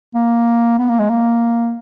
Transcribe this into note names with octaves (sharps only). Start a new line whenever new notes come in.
A#3
B3
A#3
G#3
A#3